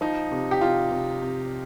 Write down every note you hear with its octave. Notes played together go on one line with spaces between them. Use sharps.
F3 D#4
C3
G4
C3 F4
C3
C3